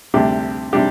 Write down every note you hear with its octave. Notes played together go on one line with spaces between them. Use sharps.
D2 C3 G3 D4 G4
C3 G3 D4 G4